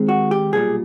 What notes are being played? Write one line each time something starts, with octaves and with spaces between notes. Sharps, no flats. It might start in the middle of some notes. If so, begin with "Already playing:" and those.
Already playing: D#2 D#3 G#3 C4
F#4
G4
B1 A#2 G3 G#4